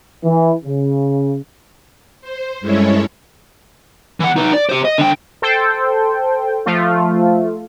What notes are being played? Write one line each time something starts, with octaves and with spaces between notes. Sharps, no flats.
E3
C#3
C5
G2 G#3 C#4 E4 A4 C#5
E3 F#5
D#4 B4
D5
G4 C5
D#5
D3 G5
A4 C5 G5
F3 A3 F4